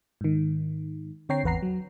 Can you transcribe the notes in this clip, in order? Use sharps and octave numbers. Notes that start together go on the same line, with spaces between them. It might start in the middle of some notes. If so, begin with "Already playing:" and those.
G#2 D#3
D3 C4 C#5 G5 A#5 C7
G#1 E2 B4 F#5 A#5 C7
F#3